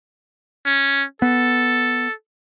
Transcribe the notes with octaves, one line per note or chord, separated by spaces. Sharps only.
C#4
B3 A4